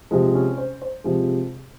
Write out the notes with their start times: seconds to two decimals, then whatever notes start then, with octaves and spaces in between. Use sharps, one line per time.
0.11 C3 F3 G#3
0.34 C#4
0.58 C5
0.82 C5
1.04 C3 F3 G#3